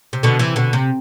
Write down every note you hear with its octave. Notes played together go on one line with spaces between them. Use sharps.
C3
B2 D3
C3 E3
B2 D3
C3